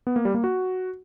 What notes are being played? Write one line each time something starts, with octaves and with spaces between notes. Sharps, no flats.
B3
A#3
G3
A#3
F#4